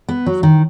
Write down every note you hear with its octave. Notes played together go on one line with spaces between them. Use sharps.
B3
F#3
D#3